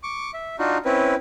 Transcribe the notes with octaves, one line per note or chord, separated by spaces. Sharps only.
C#6 D6
E5
D4 D#4 F4 F#4
C4 C#4 E4 B4